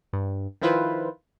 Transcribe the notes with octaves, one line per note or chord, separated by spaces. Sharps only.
G2
D#3 F3 E4 F4 B4 C5